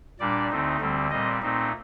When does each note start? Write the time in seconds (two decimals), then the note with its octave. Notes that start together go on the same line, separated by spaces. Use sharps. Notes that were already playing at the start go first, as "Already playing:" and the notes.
0.19 A#2 G3 D4 D5
0.50 D2 D3 A3 C4 D#4
0.80 D2 D3 G3 C4
1.11 A#2 G3 C4 D#5
1.42 A#2 A3 C4 D#4